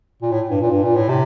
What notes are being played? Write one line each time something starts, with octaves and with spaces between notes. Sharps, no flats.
A#2
A2
G2
A#2
G2
A#2
A2
C3